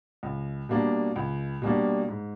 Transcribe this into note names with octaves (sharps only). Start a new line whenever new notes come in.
C#2
B2 G3 A#3 D4
C#2
B2 G3 A#3 D4
G#2